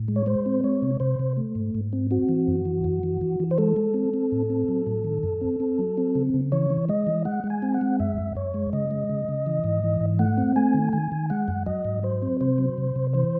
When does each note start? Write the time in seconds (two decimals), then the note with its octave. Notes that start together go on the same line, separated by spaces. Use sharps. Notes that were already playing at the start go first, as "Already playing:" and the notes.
Already playing: A2
0.08 G#3
0.16 C#5
0.26 G#3 C5
0.46 C4
0.64 G#3 C#5
0.82 C3
1.00 C3 C5
1.19 C3
1.37 A3
1.55 G#2
1.75 G#2
1.93 C4
2.11 C4 F#4
2.29 E3
2.48 F#2
2.65 E3
2.84 F#2
3.03 E3
3.21 E3
3.40 E3
3.51 C5
3.58 G#3 A4
3.76 G#3
3.94 C4
4.14 C4
4.32 A2
4.50 C4
4.68 F#3
4.86 A2
5.04 D#3
5.23 F#2
5.41 C4
5.60 C4
5.79 F#3
5.98 C4
6.15 C#3
6.34 C#3
6.52 E3 C#5
6.70 E3
6.89 G#3 D#5
7.07 E3
7.25 G#3 F#5
7.44 G#3
7.50 G#5
7.62 C4
7.74 F#5
7.81 G#3
8.00 F#2 E5
8.18 F#2
8.35 F#2 C#5
8.54 G#3
8.73 C#3 D#5
8.91 G#3
9.10 C#3
9.28 C#3
9.46 E3
9.64 G#2
9.84 E3
10.01 G#2
10.19 A3 F#5
10.38 C4
10.56 A3 G#5
10.74 D#3
10.93 D#3 G#5
11.12 D#3
11.30 G#3 F#5
11.48 F#2
11.66 F#3 D#5
11.85 G#2
12.03 F#3 C5
12.22 C4
12.41 C3 C5
12.58 F#3
12.78 C3
12.96 C3
13.13 E3 C5